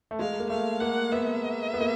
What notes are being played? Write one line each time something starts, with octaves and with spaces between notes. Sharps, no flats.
A3
G#3 F5
A#3
A3 F5
A#3 F#5
B3 E5
B3
A#3